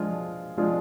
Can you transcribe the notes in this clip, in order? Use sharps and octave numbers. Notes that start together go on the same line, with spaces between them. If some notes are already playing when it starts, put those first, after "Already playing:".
Already playing: F3 G#3 D4 F4
F3 G#3 D4 F4